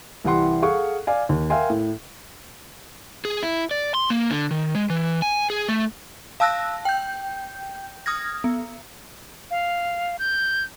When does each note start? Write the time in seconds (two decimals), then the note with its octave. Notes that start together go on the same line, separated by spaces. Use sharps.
0.25 C2 E3 G3 F#5 C6
0.62 G#4 A4 F5 F#5 C#6
1.07 D5 F5 G#5
1.29 D#2
1.50 A#4 E5 F5 G5 G#5 C6
1.70 A2
3.25 G#4
3.43 E4
3.71 D5
3.94 C6
4.10 A#3
4.31 D3
4.51 D#3
4.75 G#3
4.90 E3
5.22 G#5
5.50 G#4
5.68 A3
6.40 F5 A5 E6 F#6 A#6
6.85 G5 G6
8.06 D#6 F6 G#6 A#6
8.44 B3
9.51 F5
10.19 G6